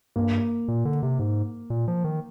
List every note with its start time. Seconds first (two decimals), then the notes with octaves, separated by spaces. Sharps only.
0.16 G2 A#3
0.68 A#2
0.85 D3
1.03 C3
1.19 G#2
1.70 A#2
1.88 F3
2.04 D#3